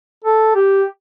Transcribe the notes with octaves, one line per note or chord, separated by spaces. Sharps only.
A4
G4